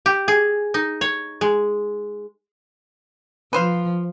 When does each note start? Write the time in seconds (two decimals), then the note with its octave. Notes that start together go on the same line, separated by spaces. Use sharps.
0.06 G4
0.28 G#4
0.74 D#4
1.01 C#5
1.41 G#3
3.53 F3 B4 C5 F5